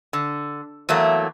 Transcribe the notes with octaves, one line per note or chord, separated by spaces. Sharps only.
D3
E2 F#3 A3 A#3